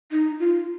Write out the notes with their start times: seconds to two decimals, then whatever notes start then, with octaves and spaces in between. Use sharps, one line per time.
0.12 D#4
0.39 F4